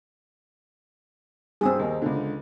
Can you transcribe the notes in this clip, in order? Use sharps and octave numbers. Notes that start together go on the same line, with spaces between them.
G2 C4 G#4 D#6 E6
D#2 A#3
C#2 D3